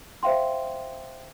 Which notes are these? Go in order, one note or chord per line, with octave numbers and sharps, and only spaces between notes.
C5 E5 F5 G5 C6